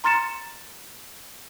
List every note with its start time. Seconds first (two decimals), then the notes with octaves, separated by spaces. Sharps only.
0.04 A#5 C6 F6 A6 C#7 E7